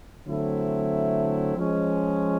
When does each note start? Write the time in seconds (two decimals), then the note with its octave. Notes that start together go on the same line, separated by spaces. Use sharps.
0.26 D3 F#3 A3 C4 E4
1.56 F3 G#3 C#4